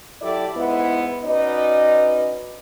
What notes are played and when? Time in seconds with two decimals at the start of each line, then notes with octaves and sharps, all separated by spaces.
0.22 F#3 E4 G4 A4 D5
0.55 G#2 B3 E4
1.23 C#4 D#4 F#4 B4 D5 D#5